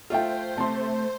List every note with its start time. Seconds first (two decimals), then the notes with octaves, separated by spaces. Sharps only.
0.10 A3 F4 A4 C5 E5 G5
0.57 C3 A3 A5 C6